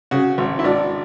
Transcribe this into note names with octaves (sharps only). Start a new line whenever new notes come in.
C#3 F#4
G#1
E4
G#1 D4